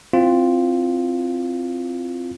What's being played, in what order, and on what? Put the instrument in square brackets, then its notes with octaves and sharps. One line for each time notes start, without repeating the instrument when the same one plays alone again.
[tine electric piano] C4 E4 F4